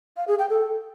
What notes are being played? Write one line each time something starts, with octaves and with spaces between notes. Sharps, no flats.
F5
G#4
G5
A4